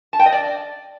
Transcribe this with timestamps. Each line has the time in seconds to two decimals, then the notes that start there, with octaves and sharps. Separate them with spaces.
0.13 A5
0.19 G5
0.26 D#5
0.32 D5